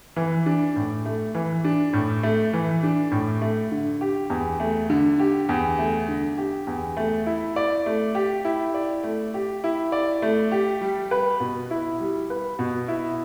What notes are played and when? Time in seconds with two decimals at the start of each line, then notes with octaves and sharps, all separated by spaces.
0.16 E3
0.46 D4
0.76 A2
1.05 A3
1.35 E3
1.64 D4
1.93 A2
2.23 A3
2.53 E3
2.83 D4
3.12 A2
3.42 A3
3.72 D3
4.01 G4
4.30 E2
4.60 A3
4.90 D3
5.19 G4
5.49 E2
5.79 A3
6.08 D3
6.38 G4
6.67 E2
6.97 A3
7.26 E4
7.56 D5
7.86 A3
8.15 G4
8.45 E4
8.74 D5
9.03 A3
9.34 G4
9.64 E4
9.92 D5
10.22 A3
10.52 G4
10.81 G3
11.11 B4
11.40 B2
11.71 E4
12.00 G3
12.30 B4
12.59 B2
12.88 E4